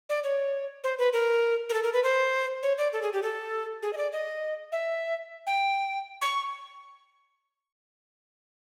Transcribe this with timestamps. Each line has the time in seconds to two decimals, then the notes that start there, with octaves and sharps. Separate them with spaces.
0.09 D5
0.24 C#5
0.84 C5
0.98 B4
1.13 A#4
1.69 A#4
1.74 A4
1.83 A#4
1.93 B4
2.04 C5
2.63 C#5
2.78 D5
2.93 A4
3.02 G#4
3.13 G4
3.23 A4
3.83 G#4
3.93 D#5
3.97 D5
4.12 D#5
4.72 E5
5.47 G5
6.21 C#6